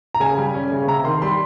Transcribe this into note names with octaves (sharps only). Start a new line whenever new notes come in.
A#5
C#3 G#5
G3
C#4
C#3
C3 A#5
D#3 C6
G3 C6